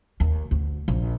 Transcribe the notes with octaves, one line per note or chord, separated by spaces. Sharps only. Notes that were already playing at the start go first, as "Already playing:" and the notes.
D#2
D2
A#1